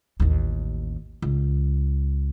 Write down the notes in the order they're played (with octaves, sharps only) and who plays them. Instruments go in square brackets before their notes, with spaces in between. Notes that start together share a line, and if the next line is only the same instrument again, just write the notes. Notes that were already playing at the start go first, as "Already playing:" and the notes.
[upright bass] A1 D#2
C#2